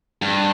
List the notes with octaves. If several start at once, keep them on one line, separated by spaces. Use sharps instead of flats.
G2